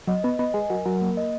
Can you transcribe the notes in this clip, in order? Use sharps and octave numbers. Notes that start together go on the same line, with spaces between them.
F#3 D#5
B3 B4
B3 D#5
G#3 G#5
F#3 A#4
F#3 A#4
A#3
D#5